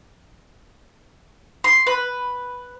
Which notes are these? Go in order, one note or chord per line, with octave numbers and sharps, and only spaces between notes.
C6
B4